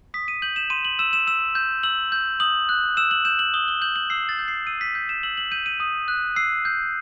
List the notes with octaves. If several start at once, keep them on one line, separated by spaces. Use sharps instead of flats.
D#6 B6
D#7
G6 F#7
E7
C6 D#7
F#7
E6 E7
E7
E6 E7
G6
E6 F#7
G6
D#6 F#7
F#6
E6 E7
F#7
G6 E7
F#7
D#6 G7
G7
G6 F#7
F#7
E6 C7
A6
G6
C7
E6 D#7
B6
G6
E7
E6 F#7
F#7
G6 D#7
D#7
D#6
F#6
E6 C7
G6